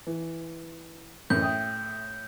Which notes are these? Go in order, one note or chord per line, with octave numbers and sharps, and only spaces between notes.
E3
F#1 A2 E3 G6
E5 G5 D#6